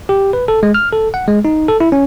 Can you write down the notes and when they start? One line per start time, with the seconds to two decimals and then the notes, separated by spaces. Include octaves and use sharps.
0.09 G4
0.33 B4
0.48 A4
0.63 G#3
0.74 F6
0.93 A4
1.14 F#5
1.28 G#3
1.45 D#4
1.68 A4
1.80 E4
1.92 C#4